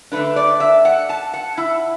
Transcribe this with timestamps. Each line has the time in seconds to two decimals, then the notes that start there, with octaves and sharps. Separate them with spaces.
0.12 D3 A3 D4 B4
0.36 D5
0.60 E5
0.85 F#5
1.09 A5
1.34 F#5
1.58 E4